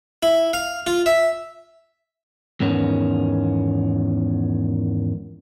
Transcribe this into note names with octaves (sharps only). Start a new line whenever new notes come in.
E4
F5
F4
E5
E2 G#2 D#3 B3 C#4